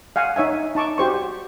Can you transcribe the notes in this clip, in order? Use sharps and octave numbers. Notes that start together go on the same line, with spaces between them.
F5 F#5 G#5
D#4 C#5 E5 G#5
D#4 A5 C#6 D6
F#4 G4 C5 C#6